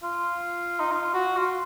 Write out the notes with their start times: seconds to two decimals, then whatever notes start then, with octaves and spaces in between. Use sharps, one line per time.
0.03 F4
0.80 D#4
0.92 F4
1.14 F#4
1.37 F4